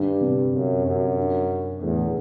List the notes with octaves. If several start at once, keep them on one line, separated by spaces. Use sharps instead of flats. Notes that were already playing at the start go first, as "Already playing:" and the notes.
Already playing: G2 D3
C3
F#2
F#2
G2
E2 A2
B2